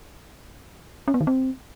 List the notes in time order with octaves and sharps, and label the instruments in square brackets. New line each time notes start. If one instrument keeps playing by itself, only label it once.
[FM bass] C#4
B3
D#3
C4